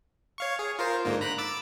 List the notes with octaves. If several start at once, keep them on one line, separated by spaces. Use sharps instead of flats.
C#5 F5 C#6
G#4
F4 A#4 C5
G#2 D3 A#3
A#5 B5 F#6
D6 E6 A6